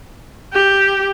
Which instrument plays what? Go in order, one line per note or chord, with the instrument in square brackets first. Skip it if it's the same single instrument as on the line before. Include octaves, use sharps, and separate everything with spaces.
[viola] G4